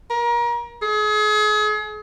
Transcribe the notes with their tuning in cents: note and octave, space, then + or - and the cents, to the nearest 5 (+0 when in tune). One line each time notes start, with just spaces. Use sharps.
A#4 +30
G#4 +35